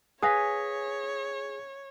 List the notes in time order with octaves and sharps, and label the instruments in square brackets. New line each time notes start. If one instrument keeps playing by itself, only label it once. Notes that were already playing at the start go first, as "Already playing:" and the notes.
[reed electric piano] G#4 [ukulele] B4 F5 G#5 [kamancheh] C#5 [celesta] D#6 A#6 B6